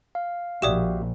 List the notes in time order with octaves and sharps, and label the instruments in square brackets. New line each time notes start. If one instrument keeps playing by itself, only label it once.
[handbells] F5
[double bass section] A#1 [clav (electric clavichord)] F#4 G4 E5 [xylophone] D5 D#6 E7